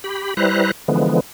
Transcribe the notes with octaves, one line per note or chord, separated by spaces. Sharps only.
G4 B5
G3 E4 B4 C5 A#5 F#6
D3 E3 F3 G#3 B3